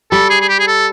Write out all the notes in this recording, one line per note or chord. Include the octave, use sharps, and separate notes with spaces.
G3 A4
G#4
G#4
G4
G#4
A4